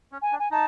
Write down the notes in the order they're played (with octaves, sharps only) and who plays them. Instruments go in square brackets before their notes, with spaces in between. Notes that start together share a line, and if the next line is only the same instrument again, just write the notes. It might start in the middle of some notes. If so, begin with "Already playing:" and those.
[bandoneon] C#4
[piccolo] G#5
[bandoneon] D4
[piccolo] G#5
[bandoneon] D#4 [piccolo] A5